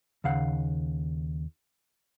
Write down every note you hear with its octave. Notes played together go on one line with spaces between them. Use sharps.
D#2 C#3 F5 F#5